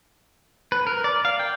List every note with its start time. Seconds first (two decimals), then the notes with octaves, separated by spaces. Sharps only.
0.72 B4
0.87 A#4
1.04 D5
1.25 F5
1.39 G5